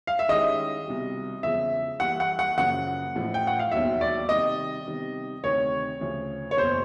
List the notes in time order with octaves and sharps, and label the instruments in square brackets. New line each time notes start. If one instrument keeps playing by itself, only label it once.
[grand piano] F5
E5
[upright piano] D#3 G#3 C#4 E4 G4 [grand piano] D#5
[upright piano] C2 B2 G3
[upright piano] E2 C#3 F3 G#3 [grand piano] E5
[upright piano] E3 G3 A#3 [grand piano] F#5
[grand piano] F#5
F#5
[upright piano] F#2 C#3 F3 A#3 [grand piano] F#5
[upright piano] A1 A2 F3
[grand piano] G5
F#5
F5
[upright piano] E1 D#2 D#3 F#3 B3 [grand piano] E5
[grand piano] D5
[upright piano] C3 D#3 G3 [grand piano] D#5
[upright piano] C3 D#3 G3 B3
[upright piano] D2 C3 D#3 [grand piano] C#5
[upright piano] D2 C#3 F3
[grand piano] C#5
[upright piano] F#1 E2 B2 [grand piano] C5